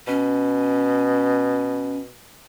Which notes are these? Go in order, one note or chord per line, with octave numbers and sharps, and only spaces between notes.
B2 C#4